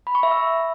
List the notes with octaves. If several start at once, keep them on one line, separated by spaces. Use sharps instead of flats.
B5
C#6
E5
E6